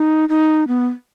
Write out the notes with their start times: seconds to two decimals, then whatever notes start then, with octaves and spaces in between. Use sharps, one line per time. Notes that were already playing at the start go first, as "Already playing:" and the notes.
Already playing: D#4
0.29 D#4
0.68 B3